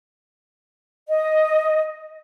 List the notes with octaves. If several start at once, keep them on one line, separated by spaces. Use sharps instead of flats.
D#5